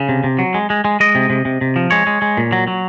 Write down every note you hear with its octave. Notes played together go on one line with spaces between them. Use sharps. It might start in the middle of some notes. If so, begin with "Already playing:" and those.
Already playing: C#3
C3
C3
F#3
G#3
G#3
G#3
G#3 D#5
C3
C3
C3
C3
F3
G#3 C#5
G#3
G#3
A#2
F#3
F#3